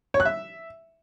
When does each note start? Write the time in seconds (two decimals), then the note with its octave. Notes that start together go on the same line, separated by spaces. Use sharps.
0.14 C#5
0.20 F#6
0.25 E5